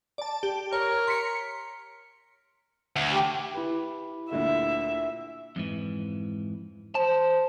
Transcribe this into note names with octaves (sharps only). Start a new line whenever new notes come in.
D5 A5
G4
A#4 C#5
C6 B6 C#7
D2
G4
E4 G4 B4
D2 A#2 D3 E5
F2 G#2 E3
C5 A5